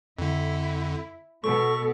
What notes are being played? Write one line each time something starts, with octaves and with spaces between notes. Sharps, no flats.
F2 D3 E4
B2 B3 A4 C#6